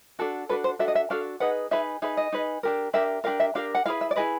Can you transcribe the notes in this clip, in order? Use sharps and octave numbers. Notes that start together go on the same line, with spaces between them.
D4 F#4 A4
D4 F#4 A4 B4
C5
D4 F#4 A4 E5
D#5
E5
D4 F#4 A4 F5
D#4 G#4 B4 F#5
D#4 G#4 B4 E5
D#4 G#4 B4 E5
D#5
D#4 G#4 B4
D4 G4 A#4
D4 G4 A#4 E5
D4 G4 A#4 F5
E5
D4 G4 A#4 F5
F#5
E4 G#4 B4 F5
E5
D5
E4 G#4 B4 D#5